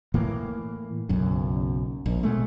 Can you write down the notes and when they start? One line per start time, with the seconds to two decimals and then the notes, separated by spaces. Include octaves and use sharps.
0.14 A2 E3 A#3
1.09 F#1 B1 F#2
2.06 A#1
2.23 B2 G#3 A3